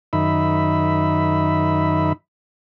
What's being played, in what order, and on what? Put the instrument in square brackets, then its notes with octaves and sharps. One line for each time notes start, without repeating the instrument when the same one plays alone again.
[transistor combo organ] F#2 D#3 D#4 E5 B5